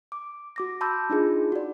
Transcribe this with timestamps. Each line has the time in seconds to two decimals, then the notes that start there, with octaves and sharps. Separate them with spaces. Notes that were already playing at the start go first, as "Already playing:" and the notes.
0.12 D6
0.56 F#4 D6 A#6
0.81 A5 B5 C6 D6 E6 G6
1.10 D4 D#4 F4 G#4
1.52 F#4 D5